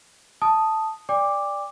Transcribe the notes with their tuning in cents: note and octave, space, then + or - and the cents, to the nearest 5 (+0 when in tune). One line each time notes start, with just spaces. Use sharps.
A5 +0 D#6 +0
D5 +0 G5 +40 D6 +0